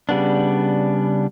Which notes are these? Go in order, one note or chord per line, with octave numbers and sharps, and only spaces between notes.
C#3 G3 B3 D4